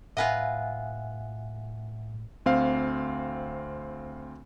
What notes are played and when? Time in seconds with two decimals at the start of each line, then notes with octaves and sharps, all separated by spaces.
0.17 A2 F4 B4 D#5 E5 F#5 G#5
2.46 D2 C4 F5